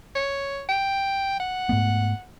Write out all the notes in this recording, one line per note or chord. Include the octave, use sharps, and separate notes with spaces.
C#5
G5
F#5
G#2 A3 B3